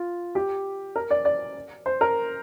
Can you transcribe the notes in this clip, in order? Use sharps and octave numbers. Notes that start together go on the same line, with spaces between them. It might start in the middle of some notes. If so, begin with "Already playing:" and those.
Already playing: F4
G4
A#4
D5
D5
C5
A#4